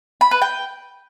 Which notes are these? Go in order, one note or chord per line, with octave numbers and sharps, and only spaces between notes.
B5
B4
G5